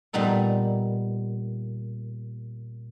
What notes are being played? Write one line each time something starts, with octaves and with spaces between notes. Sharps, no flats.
A#2 G3 B3 D#4 A4